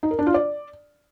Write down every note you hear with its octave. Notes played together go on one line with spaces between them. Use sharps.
D#4
A#4
D4
F4
D5